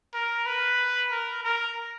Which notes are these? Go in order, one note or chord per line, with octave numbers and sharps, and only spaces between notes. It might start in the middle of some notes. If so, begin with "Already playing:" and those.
A#4
B4
A#4
A#4